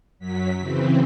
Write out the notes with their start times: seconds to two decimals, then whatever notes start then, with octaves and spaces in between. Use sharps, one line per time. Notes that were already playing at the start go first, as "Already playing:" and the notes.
0.19 F#2 F#3 B6
0.60 C#3 E3 C4